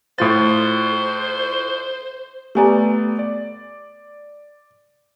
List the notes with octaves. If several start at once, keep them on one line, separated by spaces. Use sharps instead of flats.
A2 F4 C5 A6
A3 B3 G4 D5 G#5 A#5
D5